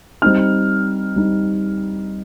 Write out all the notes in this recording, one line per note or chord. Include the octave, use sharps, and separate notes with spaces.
G3 C4 D#4 F6
G3 C4 D#4